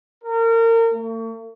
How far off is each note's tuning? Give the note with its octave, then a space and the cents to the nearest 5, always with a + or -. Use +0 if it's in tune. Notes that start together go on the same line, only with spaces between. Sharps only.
A#4 -30
A3 +45